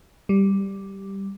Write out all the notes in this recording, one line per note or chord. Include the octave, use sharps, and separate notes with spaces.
G3